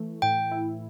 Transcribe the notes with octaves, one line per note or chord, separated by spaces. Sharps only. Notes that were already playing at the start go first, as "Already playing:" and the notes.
Already playing: E3 A3
A2 G5
E4